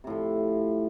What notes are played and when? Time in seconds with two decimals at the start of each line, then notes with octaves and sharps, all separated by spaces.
0.04 C3
0.07 A2
0.10 F3